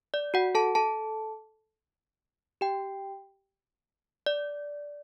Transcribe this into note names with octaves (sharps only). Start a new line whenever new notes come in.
D5
F#4 F#5
A4 A5
A4 A5
G4 G5
D5